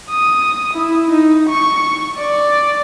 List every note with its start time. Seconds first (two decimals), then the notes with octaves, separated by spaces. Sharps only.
0.10 D#6
0.73 E4
1.10 D#4
1.49 C#6
2.17 D5